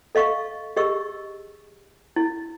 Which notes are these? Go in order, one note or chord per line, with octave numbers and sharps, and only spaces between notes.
A4 D#5 F5 C#6
G4 G#4 D#5 C#6 E6
E4